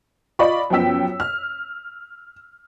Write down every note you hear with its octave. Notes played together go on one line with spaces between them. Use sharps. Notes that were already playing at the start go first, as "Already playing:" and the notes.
F4 D5 D#5 B5 C#6
F#2 F3 B3 G5 E6 B6
F6